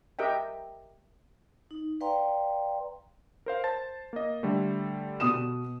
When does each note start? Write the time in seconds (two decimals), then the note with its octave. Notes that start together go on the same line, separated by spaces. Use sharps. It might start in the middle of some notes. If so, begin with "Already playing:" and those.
0.19 G4 A#4 D#5 E5 G5
1.71 D#4
2.01 B4 D5 F5 G5 A#5 C6
3.46 A#4 C5 F5
3.64 C5 A5 A6
4.13 A#3 D#5
4.43 D3 G3 A3
5.20 B2 D#6 E7